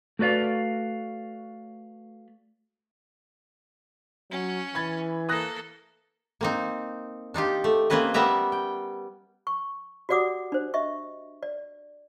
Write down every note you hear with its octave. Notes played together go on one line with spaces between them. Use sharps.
A3 F#4 B4 D5 F5
F#3 C#4
E3 B5 G#6 A6
A#3 A4 D#6 F#6 A#6
A#3 C4 D#4
D4 D#4 F4 G4
A3
A#3 C4 C#4 B4 D#5
G3 B3 A#4 E5 A#5
G5
C#6
F#4 G4 D5 F#5 D6 D#6
D4 C5
D#5 E5 C#6
D5